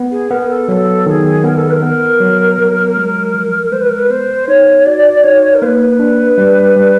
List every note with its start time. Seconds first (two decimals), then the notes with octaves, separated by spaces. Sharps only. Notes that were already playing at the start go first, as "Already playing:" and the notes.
Already playing: B3
0.11 G#4
0.31 B3 A#4
0.49 A4
0.68 F#3 A4 A#4
1.06 D#3 A4
1.11 G#4
1.44 B3 A#4
1.57 A4
1.70 B4
1.73 A#4
1.82 B3
2.20 F#3
2.58 F#3
2.97 G#3
3.34 F3
3.72 G#3 C5
3.81 B4
3.89 A#4
3.99 B4
4.10 B3 C5
4.48 D#4 C#5
4.86 F#4 D5
5.24 D#4 C#5
5.55 A#4
5.62 A#3 C5
5.66 B4
5.99 D4
6.38 G3
6.76 G3